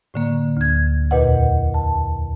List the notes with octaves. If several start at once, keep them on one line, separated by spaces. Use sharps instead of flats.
A2 D3 A#3
D2 G#6
E2 A#2 B4 D#5 F#5
A5